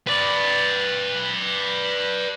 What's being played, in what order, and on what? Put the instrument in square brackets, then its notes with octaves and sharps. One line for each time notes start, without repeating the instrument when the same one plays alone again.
[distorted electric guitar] B4 D5